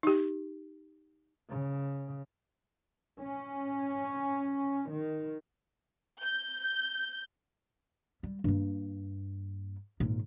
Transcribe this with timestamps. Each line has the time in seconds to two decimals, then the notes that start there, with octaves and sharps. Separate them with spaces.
0.03 D#4 G4
1.50 C#3
3.21 C#4
4.89 D#3
6.22 G6
8.23 G3
8.44 G2 A#3
10.00 G#1 A#2